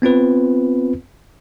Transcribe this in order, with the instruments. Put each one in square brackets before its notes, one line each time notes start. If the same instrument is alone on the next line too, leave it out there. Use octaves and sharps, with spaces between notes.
[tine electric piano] B3 C4 F4 B4